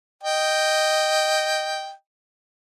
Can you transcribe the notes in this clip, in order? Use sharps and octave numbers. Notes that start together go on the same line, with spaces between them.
D#5 G5